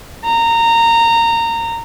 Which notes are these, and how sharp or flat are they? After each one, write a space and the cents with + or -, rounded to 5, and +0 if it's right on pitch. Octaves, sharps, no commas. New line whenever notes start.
A#5 -20